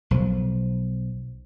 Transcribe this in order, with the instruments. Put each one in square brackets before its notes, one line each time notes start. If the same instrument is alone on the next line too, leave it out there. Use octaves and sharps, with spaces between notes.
[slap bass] B1 F3